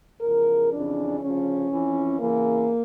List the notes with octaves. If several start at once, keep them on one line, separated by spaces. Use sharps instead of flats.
E2 C#3 F3 A#4
F2 C#3 E3 D4
D2 C#3 F3 C#4
F2 E3
E2 C#3 E3 A#3